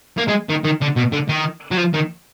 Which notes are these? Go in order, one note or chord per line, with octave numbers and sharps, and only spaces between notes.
A#3
G#3
D#3
D#3
D3
B2
D3
D#3
F#3
F3
D#3